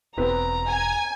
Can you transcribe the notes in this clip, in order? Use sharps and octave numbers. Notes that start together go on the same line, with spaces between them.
E1 B3 C4 B4 A#5
G#5